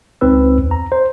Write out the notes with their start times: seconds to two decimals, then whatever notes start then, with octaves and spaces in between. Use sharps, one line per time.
0.21 C#2 C4 D#4 B4 E6
0.58 E2
0.71 A#5
0.92 C5